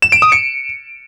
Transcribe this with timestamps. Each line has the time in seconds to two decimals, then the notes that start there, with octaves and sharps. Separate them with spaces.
0.02 E7
0.12 D7
0.22 D#6
0.32 C#7